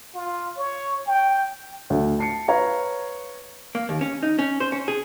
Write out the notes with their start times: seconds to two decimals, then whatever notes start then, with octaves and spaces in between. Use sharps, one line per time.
0.14 F4
0.57 C#5
1.06 G5
1.90 D2
2.18 A5 C7 C#7
2.48 B4 C#5 F5 A#5
3.75 A#3
3.89 D#2
4.01 C#4
4.23 D#4
4.39 C#4
4.60 C5
4.72 C#4
4.88 G#4